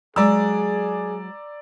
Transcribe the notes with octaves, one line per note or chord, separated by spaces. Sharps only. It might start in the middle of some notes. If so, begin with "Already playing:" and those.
F#3 G#3 G#4 D5 A#5 E6